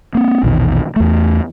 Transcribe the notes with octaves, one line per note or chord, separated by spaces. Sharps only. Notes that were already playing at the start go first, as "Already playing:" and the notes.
A#3 C4
A#1 E2 B2 D#3
E2 A3